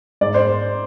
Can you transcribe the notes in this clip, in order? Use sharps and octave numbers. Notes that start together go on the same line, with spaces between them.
G#2 D5
C5